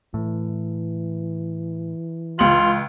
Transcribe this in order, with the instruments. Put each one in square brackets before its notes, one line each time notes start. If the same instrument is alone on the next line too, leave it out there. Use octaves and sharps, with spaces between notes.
[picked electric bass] A2 [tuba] E3
[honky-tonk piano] C#2 F#7 [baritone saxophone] F4